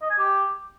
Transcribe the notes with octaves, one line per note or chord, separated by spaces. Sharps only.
D#5
G#5
G4